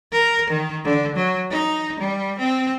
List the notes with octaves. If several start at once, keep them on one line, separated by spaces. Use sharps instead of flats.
A#4
D#3
D3
F#3
D#4
G3
C4